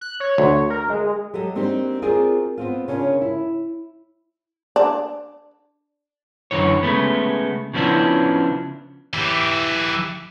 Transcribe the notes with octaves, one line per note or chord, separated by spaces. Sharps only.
F#6
C#5
D2
A#4
G#3
F#3 G4 A4 D#5
A#3 C4 D4 D#4 F#4 G4
C4 F4 F#4 G#4 A#4 D5
B3 C4 F4
C#3 C#4 D4 F4 A#4
E4
D4
F#2 B2 D3 E3 C#5
C#3 G#3 A3 B3
C#3 F3 B3 C#4 D4 E4
E3 G4